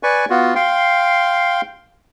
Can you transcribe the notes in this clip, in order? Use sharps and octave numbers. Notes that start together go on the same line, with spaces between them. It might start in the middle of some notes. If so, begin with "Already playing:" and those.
B4 D5 G#5 C#6
B3 F4 F#4
F5 G5 C6